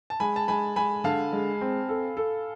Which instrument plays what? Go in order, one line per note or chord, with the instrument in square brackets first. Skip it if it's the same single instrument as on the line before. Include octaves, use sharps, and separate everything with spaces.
[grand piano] A5
[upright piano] G#3 [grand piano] G#5 B5
[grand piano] A5
[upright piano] G#3 [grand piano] G#5 B5
[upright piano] G#3 [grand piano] G#5 B5
[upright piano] D3 [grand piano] F5 A5
[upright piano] G#3
C4
A4
A4